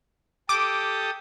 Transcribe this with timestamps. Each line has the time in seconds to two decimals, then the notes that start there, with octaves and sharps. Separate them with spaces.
0.49 G4 A4 D6 D#6